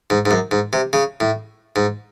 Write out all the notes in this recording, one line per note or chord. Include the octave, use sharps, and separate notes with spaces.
G#2
G#2
F#2
G#2
C3
C#3
A2
G#2